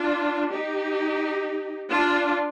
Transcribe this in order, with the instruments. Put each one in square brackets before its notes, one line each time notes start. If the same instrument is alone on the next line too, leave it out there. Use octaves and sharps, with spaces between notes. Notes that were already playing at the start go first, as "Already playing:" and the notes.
Already playing: [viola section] D4 F4
D#4 G4
D4 F4